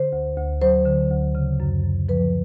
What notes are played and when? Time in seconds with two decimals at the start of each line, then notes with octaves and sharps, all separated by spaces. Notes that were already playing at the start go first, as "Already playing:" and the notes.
Already playing: D3 C5
0.13 D2
0.37 D2
0.62 F#3 C5
0.86 D3
1.10 D2
1.35 C#3
1.60 F#2
1.84 F#2
2.09 F3 B4